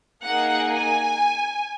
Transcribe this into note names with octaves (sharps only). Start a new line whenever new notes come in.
A#3 D#4 G#4 F#5
G#5